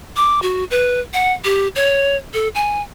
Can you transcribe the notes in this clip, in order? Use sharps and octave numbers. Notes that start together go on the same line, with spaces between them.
D6
F#4
B4
F#5
G4
C#5
A4
G#5